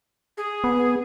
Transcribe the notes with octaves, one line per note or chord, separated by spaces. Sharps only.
G#4
B3